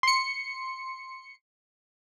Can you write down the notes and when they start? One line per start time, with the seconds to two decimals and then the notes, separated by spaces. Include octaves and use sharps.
0.03 C6 C#7